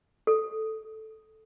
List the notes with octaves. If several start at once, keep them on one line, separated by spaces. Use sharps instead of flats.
A4